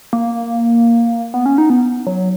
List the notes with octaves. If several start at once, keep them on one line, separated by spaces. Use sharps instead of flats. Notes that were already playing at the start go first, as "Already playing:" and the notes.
A#3
B3
C#4
D#4
B3
F#3